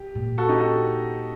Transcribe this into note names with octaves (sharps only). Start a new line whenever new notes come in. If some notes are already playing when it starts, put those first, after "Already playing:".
Already playing: G4
A#2
F#4 A4
D#4 G4
F#4 A4